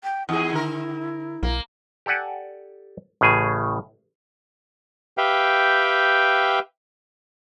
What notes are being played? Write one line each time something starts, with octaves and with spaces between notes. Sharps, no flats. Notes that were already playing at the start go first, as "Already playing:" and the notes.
G5
E2 E4 G#4
D3 A#4
B1 A#3
G4 A4 D5 F#5 G#5
A1 A2 C#3 G#4 G#5
G4 B4 E5 F5 G5